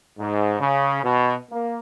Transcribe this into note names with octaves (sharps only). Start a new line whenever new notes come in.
G#2
C#3
B2
A#3